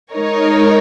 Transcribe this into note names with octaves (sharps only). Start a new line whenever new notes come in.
G#3 D#4 A#4 C#5